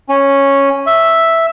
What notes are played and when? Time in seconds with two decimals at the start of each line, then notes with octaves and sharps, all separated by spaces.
0.09 C#4
0.86 E5